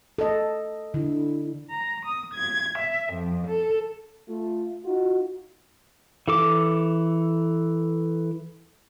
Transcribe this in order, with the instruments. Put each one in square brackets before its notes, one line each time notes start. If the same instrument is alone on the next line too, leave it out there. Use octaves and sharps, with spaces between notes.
[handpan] A4 D#5
[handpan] D3 [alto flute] E4
[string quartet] A#5
D#6
G#6
E5
F2
A4
[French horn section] A3 F4
D#4 F4 F#4
[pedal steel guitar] E3 A4 D6